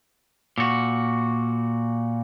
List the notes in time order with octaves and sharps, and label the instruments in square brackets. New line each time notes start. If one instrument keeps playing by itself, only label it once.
[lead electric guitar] A#2 F#4